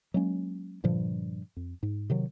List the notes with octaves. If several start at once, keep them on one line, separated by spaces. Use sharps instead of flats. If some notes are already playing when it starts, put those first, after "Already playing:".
F#3 G#3 A#3 C#4
G2 A#2 D3 F3
F2
G#2
C3 D#3 F#3